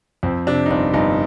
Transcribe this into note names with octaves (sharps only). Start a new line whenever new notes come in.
F2 C4
C3 D4
D#4
G1 D4
G1 D#4